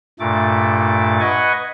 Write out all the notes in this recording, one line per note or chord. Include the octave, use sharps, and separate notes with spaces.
G2 A#2 A3 D6
B4 D#5 F#5 G#5 C#6